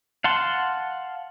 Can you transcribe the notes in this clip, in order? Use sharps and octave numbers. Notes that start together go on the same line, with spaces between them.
F5 F#5 A5 C6